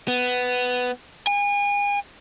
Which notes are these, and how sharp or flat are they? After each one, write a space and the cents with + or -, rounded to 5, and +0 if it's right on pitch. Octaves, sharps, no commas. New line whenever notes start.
B3 +10
G#5 -35